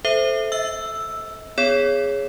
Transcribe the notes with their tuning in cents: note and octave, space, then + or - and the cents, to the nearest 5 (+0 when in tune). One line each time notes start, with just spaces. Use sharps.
A4 -10 C5 -5 E5 +0
D#5 +45 E6 +5
B3 +10 G#4 +0 C#5 +0